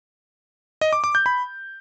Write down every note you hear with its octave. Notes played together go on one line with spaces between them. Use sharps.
D#5
D6
D6
G6
B5